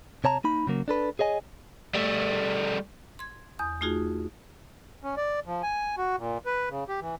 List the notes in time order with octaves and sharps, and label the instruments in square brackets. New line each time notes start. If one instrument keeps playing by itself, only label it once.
[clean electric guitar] C3 C#5 A5 A#5
A#3 D#4 B5
C#3 F#3 A#3
D4 A4 B4
G#4 C#5 D#5 G#5
[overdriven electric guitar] G3 A3
[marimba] C6 G#6
E2 D#6
A3 D#4 F4 F#4 G#4
[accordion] C#4
D5
F3
G#5
F#4
A#2
B4
C#3
G4
E3